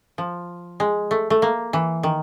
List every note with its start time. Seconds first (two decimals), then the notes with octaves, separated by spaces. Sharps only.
0.18 F3
0.80 G#3
1.11 A3
1.30 A3
1.42 A#3
1.73 E3
2.03 D#3